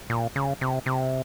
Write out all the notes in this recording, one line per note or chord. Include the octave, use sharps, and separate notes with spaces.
A#2
C#3
C3
C3